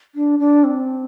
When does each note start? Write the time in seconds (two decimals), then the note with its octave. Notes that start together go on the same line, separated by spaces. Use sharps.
0.15 D4
0.39 D4
0.64 C4